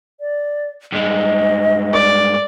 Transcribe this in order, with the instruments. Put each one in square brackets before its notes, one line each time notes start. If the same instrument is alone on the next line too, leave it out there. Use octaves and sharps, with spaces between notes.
[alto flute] D5
[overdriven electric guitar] G2 G#3 [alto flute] D#5
[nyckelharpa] D5